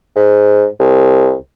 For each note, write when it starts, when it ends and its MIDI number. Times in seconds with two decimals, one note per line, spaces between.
0.16 0.66 44
0.80 1.34 36